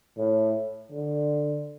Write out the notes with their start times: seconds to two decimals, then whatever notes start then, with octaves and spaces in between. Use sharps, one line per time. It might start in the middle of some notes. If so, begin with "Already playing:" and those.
0.17 A2
0.92 D3